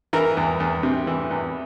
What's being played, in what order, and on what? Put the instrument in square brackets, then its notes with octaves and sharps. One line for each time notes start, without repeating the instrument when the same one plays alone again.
[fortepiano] E3 A#4
E2
E2
C3
E3
E2